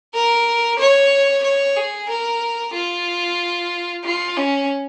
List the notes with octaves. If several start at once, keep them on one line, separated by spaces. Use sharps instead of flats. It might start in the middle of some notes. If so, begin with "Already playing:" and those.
A#4
C#5
C#5
G#4
A#4
F4
F4
C#4